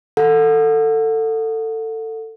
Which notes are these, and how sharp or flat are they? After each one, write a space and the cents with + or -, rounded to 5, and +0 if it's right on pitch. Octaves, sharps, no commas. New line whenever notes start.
A4 +20 F#5 -30